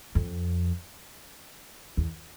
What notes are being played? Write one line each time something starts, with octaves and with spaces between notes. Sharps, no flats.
F2
E2